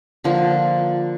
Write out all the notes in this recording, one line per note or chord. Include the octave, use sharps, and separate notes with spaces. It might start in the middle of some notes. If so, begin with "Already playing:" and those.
D3 F3 A#3